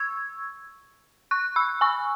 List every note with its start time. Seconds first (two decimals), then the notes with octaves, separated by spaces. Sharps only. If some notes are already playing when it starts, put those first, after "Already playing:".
Already playing: C#6 E6 G#6
1.31 C#6 F#6
1.56 B5 E6
1.81 G#5 C#6